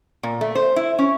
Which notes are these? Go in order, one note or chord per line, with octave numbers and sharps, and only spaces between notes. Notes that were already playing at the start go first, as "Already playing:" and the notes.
A#2
A3
C5
E4
C#4